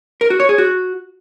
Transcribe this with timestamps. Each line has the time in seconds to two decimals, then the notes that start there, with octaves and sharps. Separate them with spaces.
0.21 A#4
0.30 F#4
0.40 C#5
0.49 G#4
0.58 F#4